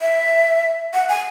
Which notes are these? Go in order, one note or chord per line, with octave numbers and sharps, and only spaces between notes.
E5
F#5
G#5